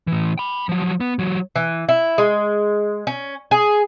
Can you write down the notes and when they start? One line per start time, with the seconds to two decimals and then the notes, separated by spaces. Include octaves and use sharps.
0.07 A2 E3
0.38 G5 B5
0.69 F3 F#3
1.00 B3
1.19 E3 F#3
1.56 E3
1.89 E4
2.18 G#3
3.07 C#4
3.51 G#4